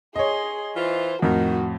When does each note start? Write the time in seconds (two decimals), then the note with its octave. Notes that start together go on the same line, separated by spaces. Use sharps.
0.16 G#4 C#5 D#5 C6
0.76 E3 F4 C5
1.22 F2 A2 D#3 F#4